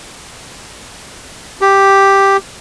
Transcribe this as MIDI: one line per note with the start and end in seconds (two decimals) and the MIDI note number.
1.61 2.37 67